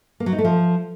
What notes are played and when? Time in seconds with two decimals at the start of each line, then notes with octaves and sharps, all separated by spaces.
0.20 A#3
0.26 F#3
0.32 D#4
0.38 A3
0.45 F3